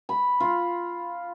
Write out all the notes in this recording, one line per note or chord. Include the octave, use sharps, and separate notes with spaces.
B5
F4